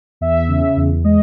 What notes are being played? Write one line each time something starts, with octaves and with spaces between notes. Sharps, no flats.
E2 E5
C#3
E2
G#3 D#5